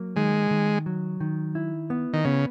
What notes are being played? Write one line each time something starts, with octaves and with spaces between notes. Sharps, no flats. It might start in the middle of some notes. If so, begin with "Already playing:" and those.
Already playing: F#3 A#3
D#3 G#3
D#3
F#3
D#3
E4
B3
D#3
C#3 B3